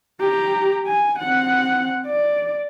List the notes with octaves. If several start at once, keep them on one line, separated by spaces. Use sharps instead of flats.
G4 A#5
G#5
C4 F#5
D5